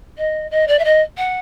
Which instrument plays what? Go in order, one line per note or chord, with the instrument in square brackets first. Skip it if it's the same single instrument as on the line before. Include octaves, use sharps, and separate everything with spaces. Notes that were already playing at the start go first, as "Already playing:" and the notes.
[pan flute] D#5
D#5
D5
E5
D#5
F#5